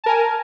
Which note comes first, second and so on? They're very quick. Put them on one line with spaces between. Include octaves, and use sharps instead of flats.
A5 A#4 G#5